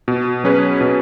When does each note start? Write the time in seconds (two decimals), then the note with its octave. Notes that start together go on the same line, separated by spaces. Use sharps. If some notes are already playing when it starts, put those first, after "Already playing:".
0.08 B2
0.44 F#3 C#4 G#4 B4
0.81 B2